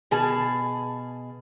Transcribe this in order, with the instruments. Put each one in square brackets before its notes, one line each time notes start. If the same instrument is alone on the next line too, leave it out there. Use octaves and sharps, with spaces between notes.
[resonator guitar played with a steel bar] B2 G#4 A5